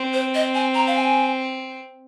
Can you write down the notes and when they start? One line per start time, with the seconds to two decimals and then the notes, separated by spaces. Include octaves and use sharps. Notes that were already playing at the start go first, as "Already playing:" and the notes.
Already playing: C4
0.13 C5
0.34 D#5
0.54 G#5
0.75 A#5
0.87 F5
0.95 G#5